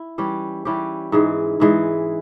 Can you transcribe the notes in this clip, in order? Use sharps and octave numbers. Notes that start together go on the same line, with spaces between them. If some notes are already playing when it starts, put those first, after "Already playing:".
Already playing: E4
E3 G3 C#4 G4
E3 G3 C#4 G4
G#2 E3 G#3
G#2 E3 G#3